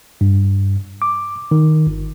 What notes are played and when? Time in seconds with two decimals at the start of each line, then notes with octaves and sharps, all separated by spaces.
0.21 G2
1.02 D6
1.51 D#3
1.87 G1